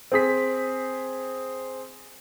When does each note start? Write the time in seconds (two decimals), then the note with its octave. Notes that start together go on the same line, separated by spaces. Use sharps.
0.12 C4 G#4 B6